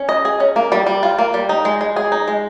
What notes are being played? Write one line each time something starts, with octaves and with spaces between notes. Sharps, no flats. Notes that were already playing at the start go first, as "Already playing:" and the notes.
Already playing: C#4
D#5
G#4
C#4
A#3
G3
G3
F4
A#3
G3
D#4
G#3
G#3
G#4
D#4
G#3